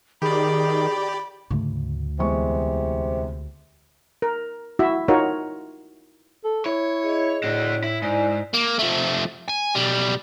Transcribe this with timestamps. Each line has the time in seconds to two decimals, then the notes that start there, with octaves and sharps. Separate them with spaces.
0.22 D#3 G4 G#4 D5 B5
1.50 D2 G#2 C#3 A3
2.19 E2 C3 G3 G#3 C#6
4.22 A#4
4.79 E4 F#4 E5
5.08 D#4 F4 F#4 A#4 C#5
6.44 A4
6.66 E4 C#5
7.03 G#4 D#5
7.44 A2 D4 F#4
7.84 E4
8.02 G#2 E4 D5 G#5
8.54 A#3
8.79 F3 A3
9.49 G#5
9.75 B1 G3